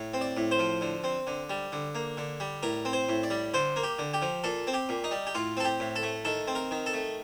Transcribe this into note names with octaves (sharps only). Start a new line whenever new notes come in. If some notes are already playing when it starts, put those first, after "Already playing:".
Already playing: A2
C4
D5
A2
C5
F3
D3
C4
D3
G3
D3
A#3
D3
G3
A2 A#4
C4
C5
A2
D5
G3
D3 C5
A#3
G4
D3
G4
F3
A#2 A4
C4
G4
A#2
D#4
G3
G4
A2 F4
C4 A4
G4
A2
A4
A3
D#3 A4
C4
A#4
D#3
A4
A3